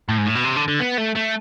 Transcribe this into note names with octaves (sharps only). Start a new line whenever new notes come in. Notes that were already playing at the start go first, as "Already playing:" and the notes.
A2
G#2
A2
B2
C3
D3
D3
B3
A3
A3